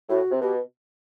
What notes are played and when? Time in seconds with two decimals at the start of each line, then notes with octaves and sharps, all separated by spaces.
0.09 A2 F#4
0.31 C3
0.42 B2 G4